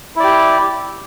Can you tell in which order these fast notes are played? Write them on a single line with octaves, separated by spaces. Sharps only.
E4 D5 G4